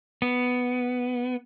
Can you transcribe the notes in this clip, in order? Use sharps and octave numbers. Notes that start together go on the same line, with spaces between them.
B3